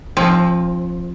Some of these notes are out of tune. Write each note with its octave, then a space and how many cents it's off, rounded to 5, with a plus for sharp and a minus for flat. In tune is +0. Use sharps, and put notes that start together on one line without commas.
F3 +0 C4 +30